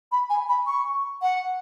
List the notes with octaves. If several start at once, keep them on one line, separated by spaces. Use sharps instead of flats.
B5
G#5
B5
C#6
F#5